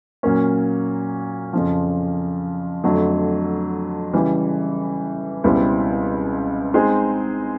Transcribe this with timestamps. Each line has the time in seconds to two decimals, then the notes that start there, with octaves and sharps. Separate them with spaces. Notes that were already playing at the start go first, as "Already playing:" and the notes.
0.23 A#2 F#3 A#3 C#4
1.53 F2 C#3 F3
2.84 F2 D3 F#3 A3
4.14 C#3 E3 G3
5.44 C#2 B2 G3 C4 E4
6.74 G#3 C4 D#4 G#4